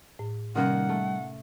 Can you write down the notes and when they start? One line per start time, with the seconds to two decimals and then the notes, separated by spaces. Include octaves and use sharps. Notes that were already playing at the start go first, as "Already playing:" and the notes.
0.19 A2
0.56 C3 D#3 G3 A#3 C#4 F#5
0.89 A3